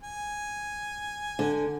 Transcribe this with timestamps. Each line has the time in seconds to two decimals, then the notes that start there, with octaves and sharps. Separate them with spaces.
0.03 G#5
1.39 D3